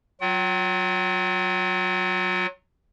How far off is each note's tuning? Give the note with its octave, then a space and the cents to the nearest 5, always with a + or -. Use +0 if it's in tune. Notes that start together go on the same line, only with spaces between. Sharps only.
F#3 +0 F4 +40 G5 -45